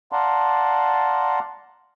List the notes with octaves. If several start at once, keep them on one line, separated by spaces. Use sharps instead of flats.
D5 F5 F#5 A5 A#5 C6